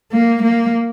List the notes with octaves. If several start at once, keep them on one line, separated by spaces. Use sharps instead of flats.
A#3
A#3